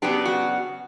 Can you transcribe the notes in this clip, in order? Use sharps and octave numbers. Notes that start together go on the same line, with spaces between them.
C#3 F#3 B3 D4 G4
F#4